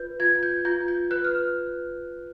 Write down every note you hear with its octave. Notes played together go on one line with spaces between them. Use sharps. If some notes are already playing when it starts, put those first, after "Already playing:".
Already playing: F4 B4 G6
F4 G#6
G6
F4 G6
G6
B4 F#6
F6